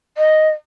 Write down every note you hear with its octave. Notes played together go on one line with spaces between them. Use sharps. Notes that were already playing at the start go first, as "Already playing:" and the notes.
D#5